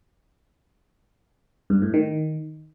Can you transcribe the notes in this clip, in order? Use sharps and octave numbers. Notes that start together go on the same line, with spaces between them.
G2
A2
D#3